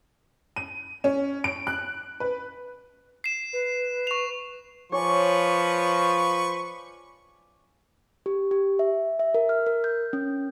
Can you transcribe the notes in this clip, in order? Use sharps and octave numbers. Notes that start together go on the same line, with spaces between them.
D#7
C#4
D7
F#6
B4
C7 E7
B4
C#6 F7
F3 B4 C#5 D5 G#5 C#6
G4
G4
E5
E5
A#4
F6
A#4
G6
C#4